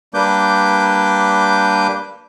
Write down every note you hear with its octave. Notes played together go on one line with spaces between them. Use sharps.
G3 A#3 D4 B4 D6 G6